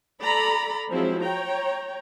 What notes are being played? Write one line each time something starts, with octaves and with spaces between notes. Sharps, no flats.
A4 D5 A#5 B5
F3 F#3 G#3 C4 E4
C#5 G5 A#5